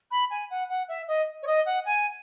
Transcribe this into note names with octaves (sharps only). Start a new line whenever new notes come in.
B5
G#5
F#5
F#5
E5
D#5
C#5
D#5
F#5
G#5